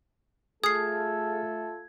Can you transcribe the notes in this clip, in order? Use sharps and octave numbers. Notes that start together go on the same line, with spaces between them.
A3 F4 G#4 A4 D#6 F6 G#6 C7